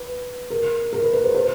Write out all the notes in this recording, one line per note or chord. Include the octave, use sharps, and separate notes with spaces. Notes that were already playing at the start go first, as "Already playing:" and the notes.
Already playing: B4
A#4
A#4
B4
B4
C5
C5